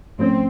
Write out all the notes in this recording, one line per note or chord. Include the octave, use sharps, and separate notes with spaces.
G#2 F3 A3 C4 C#4